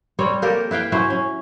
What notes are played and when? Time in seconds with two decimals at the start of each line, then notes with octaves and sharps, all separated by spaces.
0.19 G3 C4 C#5
0.42 A#3 G4 A4 A#4
0.71 E4 B4 F5 G5
0.92 F#3 C#4 E4 C5
1.10 C#4